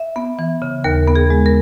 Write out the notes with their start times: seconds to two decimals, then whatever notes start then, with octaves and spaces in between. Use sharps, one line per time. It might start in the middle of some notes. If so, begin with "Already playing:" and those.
Already playing: E5
0.16 B3
0.39 E3
0.62 C#3
0.84 D#2 A#4
1.08 B3
1.16 G#4
1.30 G#3
1.46 A#4